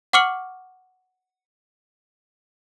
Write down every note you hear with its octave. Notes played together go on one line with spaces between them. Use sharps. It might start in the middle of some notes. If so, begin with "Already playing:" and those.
F#5 C#6 D6 F6 C#7 F#7